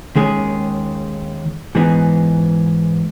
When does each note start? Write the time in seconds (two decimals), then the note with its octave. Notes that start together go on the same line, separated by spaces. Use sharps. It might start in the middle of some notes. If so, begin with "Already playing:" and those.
0.16 D#2 D#3 G#3 C#4 G#4
1.75 G#2 E3 B3 D#4 G#4